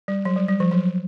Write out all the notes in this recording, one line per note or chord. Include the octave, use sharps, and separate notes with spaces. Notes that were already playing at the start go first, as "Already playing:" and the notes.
G3
F#3
G3
G3
F3
F#3